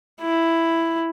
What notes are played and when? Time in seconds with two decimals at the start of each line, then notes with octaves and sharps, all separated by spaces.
0.21 E4